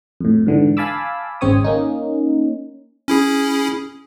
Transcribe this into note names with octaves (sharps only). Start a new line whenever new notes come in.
F2 A2
G#2 D3 E3
F5 G#5 A5 B5 D6 E6
G#1 C#3 C4 C#5 D#6
A#3 C#4 D#4
C#4 E4 G#4